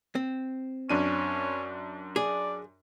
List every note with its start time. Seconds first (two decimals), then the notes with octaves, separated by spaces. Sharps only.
0.15 C4
0.90 F#2 C#4 D4 D#7
2.16 G#4 D5